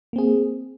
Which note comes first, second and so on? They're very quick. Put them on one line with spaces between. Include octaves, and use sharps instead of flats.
A#3 C4 G#4